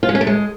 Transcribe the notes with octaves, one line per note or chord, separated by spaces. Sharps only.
F4
G#3
C#4
A3
G#3